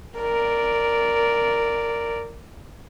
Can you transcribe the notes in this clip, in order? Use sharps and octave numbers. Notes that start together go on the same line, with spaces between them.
A#4 D5